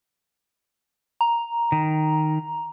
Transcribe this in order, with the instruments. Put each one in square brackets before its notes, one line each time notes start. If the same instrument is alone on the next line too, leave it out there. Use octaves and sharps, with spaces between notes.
[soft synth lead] A#5
[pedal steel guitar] D#3